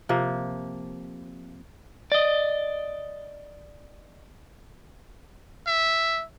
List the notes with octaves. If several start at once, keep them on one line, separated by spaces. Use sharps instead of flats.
C3 F3 A#3
D5 D#5
E5